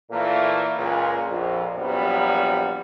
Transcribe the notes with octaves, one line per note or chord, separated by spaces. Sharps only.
A#2 E3 A3 A#3
C#2 A#2
A#1 F2
A#1 F#2 G3 B3